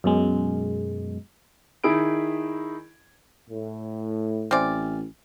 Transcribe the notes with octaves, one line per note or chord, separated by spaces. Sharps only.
F#2 B2 G#3
D#3 D#4 E4 G#4 B5 D7
A2
A1 C4 D5 E5 G#5 F6